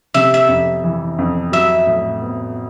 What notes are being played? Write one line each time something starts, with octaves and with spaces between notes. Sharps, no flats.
C3 E5
E5
F2
E3
F2
F#3 E5
A2
B3